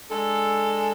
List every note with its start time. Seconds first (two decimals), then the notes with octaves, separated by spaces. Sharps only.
0.11 G#3 D4 A4